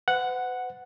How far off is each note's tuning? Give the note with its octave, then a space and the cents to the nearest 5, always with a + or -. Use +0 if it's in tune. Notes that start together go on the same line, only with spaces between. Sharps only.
B4 +45 F#5 +0